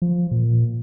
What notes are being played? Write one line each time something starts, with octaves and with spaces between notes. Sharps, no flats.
F3
A#2